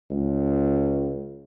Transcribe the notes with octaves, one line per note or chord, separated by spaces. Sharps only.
C#2